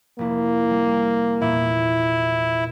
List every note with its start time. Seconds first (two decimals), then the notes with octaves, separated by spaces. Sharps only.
0.19 F1 A#3 E4
0.71 G3
1.41 E2 A#2 E4